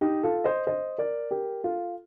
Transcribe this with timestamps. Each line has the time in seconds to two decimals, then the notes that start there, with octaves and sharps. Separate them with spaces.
0.01 D#4 G4
0.23 F4 A4
0.44 C5 D#5
0.67 C5 D#5
0.98 A#4 D5
1.31 G4 A#4
1.64 F4 A4